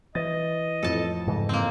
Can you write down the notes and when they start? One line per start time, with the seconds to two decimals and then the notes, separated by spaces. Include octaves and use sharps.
0.15 E3 D#5 A6
0.83 F2 A2 A4 A5
1.27 G#2 C#3 E3
1.49 A#3 C4